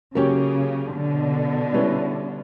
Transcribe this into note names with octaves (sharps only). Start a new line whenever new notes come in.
C#3 F#3 A#3 C#4 G4 C#5
B2 D3
G3 C#4 E4 B4